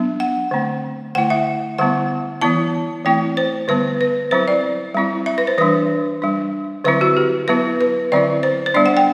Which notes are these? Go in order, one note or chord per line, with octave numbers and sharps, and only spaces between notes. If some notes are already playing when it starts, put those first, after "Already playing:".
Already playing: F#3 B3 D4
F#5
D3 A3 C4
D3 A3 E4 F#5
E5
D3 G3 B3 E4 F#5
E3 B3 E4 A5
E3 A3 C4 E4 G5
C5
D3 G3 B3 B4
B4
F#3 C4 E4 C5
D5
G3 C4 E4
E5
B4
C5
E3 G3 D4 B4
G3 D4
D3 F#3 C4 E4 B4
F#4
G4
F#3 B3 E4 B4
B4
D3 F#3 C4 E4 D5
C5
C5
G3 B3 D4 D5
F#5
G5